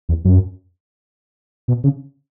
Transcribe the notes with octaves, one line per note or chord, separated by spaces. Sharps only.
E2
F#2
B2
C#3